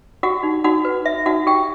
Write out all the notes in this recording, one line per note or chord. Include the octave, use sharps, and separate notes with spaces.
F#4 G4 F#5
D#4
D#4 F#4 F#5
B4
F#4 E5
D#4 F#4 F#5
D#4 G4 G5